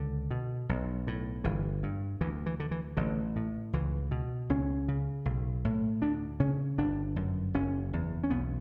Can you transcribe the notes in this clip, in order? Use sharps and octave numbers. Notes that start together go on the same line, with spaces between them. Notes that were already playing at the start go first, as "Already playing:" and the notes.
Already playing: C#2 D3
B2
B1
A2
G1 E3
G2
D2 E3
E3
D3
E3
A1 D3
A2
C#2 E3
B2
C#2 C#4
C#3
B1
A2
D2 D4
C#3 C#4
G1 D4
F#2
F#1 C#4
E2
C#4
B1 B3